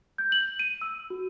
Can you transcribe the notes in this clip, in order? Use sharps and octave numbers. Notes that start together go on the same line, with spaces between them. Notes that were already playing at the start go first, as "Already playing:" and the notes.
G6
F#7
D#7
E6
F#4